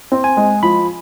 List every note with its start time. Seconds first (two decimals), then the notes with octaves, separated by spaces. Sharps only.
0.12 C4
0.24 G#5
0.37 G#3
0.63 F3 B5